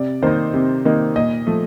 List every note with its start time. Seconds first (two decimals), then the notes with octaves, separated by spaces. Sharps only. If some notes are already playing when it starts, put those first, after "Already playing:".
Already playing: C3 D5
0.22 D#3 A#3 D#4 C5
0.54 C3
0.85 D#3 A#3 D#4
1.16 A#2 D#5
1.47 F3 A3